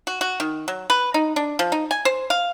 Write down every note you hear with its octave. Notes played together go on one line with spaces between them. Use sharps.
F#4
F#4
D#3
F#3
B4
D#4
D4
F3
D#4
G#5
C5
F5